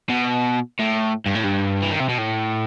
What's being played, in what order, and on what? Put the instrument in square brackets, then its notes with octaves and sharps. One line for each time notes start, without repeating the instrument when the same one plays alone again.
[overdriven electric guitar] B2
A2
G2
A2
G2
E3
D#3
C3
B2
A2